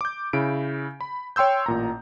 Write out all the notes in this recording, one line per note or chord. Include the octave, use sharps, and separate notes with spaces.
D6 G6
C#3 E4 D7
B5
C#5 G5 C6 E6 G6
A1 A#2 A#5